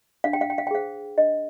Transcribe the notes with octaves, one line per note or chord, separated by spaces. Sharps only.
D4 F5
G5
F5
G5
F5
G5
G#4 C5 F5
D4 D#5